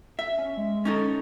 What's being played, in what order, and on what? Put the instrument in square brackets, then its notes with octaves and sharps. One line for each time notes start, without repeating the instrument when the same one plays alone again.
[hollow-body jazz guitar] E5
[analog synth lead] C#4
G#3
[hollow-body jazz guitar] C#4 D#4 A4